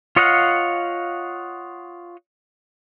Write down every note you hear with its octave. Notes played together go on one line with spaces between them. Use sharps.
F4 C#5 D#5 F5 F#5